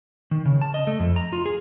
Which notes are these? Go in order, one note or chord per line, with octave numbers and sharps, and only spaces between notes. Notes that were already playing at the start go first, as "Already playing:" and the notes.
D#3
C#3
A5
D#5
A3
F2
A#5
F4
G#4